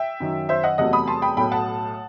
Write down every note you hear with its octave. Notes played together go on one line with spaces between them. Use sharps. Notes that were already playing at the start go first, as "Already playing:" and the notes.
Already playing: E5 G5
F#2 D#3 F#3
C5 E5
D#5 F#5
E2 C3 F#3 A3 D#5 F#5
B5 D#6
A5 C6
G5 B5
B1 A2 F#3 A3 G5 B5
F#5 A5